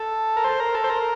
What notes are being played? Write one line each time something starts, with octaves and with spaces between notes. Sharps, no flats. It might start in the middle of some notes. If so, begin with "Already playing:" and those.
Already playing: A4
A#4
C5
A#4
A4
C5
A#4